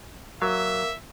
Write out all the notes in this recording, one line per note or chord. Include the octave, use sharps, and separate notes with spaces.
F#3 A#3 E5